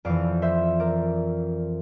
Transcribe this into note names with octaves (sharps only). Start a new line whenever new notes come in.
F2 E3 D5 F5
C5 E5
A#4 D5